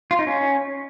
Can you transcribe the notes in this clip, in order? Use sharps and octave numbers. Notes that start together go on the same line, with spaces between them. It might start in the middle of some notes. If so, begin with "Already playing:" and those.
F4
D#4
C#4